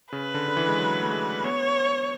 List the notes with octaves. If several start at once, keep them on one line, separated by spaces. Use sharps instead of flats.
C#3 B4
D3
D3
E3
G#3
F#3
A3
G#3
B3 C#5